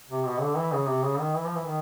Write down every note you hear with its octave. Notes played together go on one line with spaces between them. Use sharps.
C3
B2
D3
E3
C#3
C3
C#3
D#3
E3
F3
E3
D#3